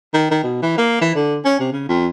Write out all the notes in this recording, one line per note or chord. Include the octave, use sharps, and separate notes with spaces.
D#3
D#3
B2
E3
A#3
E3
D3
C#4
C3
C#3
F2